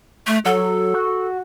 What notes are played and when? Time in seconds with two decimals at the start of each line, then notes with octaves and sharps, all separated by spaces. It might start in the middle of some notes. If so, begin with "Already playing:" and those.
0.27 A3
0.45 F#3 A4
0.94 F#4